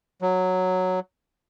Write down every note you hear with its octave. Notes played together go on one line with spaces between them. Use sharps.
F#3